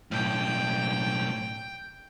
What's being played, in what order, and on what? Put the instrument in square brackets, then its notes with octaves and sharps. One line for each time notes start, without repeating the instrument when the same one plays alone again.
[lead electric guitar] B1 A2 [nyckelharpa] G5